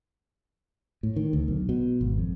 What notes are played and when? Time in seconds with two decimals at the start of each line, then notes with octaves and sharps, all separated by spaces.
1.03 A2
1.16 D#3
1.33 D2
1.48 B1
1.69 B2
2.01 G#1
2.18 F2